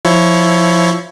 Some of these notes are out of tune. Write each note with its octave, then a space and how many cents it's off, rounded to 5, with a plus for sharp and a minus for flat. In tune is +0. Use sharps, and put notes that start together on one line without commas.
F3 +0 E4 +0 C#5 +10